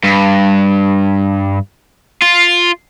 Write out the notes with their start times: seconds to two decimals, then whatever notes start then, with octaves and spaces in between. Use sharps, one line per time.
0.04 G2
2.22 F4